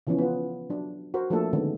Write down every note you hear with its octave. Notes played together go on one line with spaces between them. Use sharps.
C#3 E3 F3 B3 C#4
B3 F4
F#3 D4
F#4 A#4 C5
F3 A3 A#3 D4 A4
D3 D#3 G#3 B3 C#4